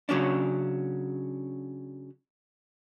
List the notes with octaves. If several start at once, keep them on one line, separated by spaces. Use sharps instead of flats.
C#3 F#3 C#4 D4